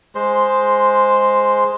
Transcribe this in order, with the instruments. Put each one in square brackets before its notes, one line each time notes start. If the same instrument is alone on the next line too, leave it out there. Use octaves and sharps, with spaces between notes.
[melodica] G#3 C5